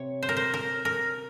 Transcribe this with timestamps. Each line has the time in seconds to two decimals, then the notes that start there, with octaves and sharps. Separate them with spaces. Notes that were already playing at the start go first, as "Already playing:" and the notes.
Already playing: C3 C#5
0.23 C5
0.29 A#4
0.37 C5
0.54 A#4
0.85 A#4